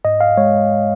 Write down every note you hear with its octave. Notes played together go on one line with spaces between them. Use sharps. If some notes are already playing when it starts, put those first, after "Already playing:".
G#2 D#5
F5
G#3 C#5